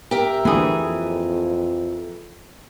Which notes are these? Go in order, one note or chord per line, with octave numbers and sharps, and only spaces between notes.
G4 A#4 E5
D2 E3 A#3 G#4
F2